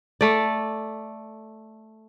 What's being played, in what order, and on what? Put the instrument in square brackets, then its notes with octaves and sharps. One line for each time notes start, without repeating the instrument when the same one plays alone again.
[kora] A3 D5